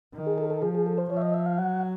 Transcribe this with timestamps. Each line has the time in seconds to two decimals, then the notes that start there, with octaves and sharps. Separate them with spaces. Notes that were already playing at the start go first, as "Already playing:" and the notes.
0.14 D#3
0.27 G#4
0.38 A4
0.50 A4
0.62 F3 G#4
0.75 G#4
0.86 A4
0.98 C5
1.10 F3 C#5
1.17 E5
1.22 D#5
1.34 E5
1.46 F5
1.58 F#3 F#5